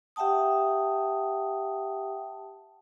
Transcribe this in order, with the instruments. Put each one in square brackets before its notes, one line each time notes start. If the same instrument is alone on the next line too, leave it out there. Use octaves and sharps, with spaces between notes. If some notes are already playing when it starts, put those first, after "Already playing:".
[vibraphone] G4 E5 F#5 G5 A5 D#6